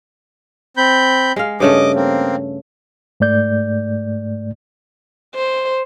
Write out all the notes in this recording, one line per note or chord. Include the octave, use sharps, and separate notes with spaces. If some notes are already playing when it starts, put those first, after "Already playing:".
C4 B5 G6
G#3 F5
G2 C#3 A3 D#5 D6
A#3 C4
G#2 A3 D5 G6
C5